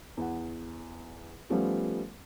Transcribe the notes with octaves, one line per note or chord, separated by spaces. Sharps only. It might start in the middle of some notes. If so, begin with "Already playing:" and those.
E2 F#5
F3 G3 A3 B3 C#4